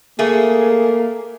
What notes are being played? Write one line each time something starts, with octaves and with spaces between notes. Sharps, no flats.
A3 A#3 G#4